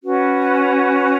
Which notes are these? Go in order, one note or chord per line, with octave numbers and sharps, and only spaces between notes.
C#4 F#4 B4